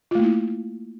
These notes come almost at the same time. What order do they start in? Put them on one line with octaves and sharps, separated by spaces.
F4 A3 A#3 E4